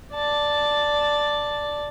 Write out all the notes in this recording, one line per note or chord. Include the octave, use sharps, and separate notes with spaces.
D5 A5